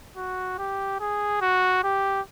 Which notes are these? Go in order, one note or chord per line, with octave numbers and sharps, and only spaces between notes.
F#4
G4
G#4
F#4
G4